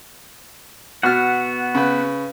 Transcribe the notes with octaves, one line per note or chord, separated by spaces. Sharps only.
B2 B3 F#4 F#5 F6
C#3 B4